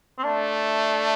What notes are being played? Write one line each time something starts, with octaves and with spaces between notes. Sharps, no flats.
C4
A3 D4